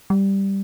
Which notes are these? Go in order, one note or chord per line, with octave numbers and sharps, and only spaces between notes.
G3